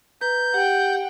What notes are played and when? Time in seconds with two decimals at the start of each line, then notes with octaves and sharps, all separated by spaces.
0.21 B4 A#5 G6
0.54 G4 F#5 G5